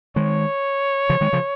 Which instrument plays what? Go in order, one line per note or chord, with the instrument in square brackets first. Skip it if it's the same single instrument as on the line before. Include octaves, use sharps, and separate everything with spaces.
[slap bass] D#3 G#3 [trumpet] C#5
[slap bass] C#3 F3
D#3 G#3
C#3 F3